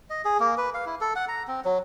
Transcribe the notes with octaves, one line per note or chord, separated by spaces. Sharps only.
D#5
G#4
A#3
B4
F5
E4
A4
F#5
A#5
C4
F#3